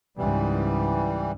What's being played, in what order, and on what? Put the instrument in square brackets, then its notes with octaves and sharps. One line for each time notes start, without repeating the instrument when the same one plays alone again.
[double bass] C#2 G#2 [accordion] E3 G3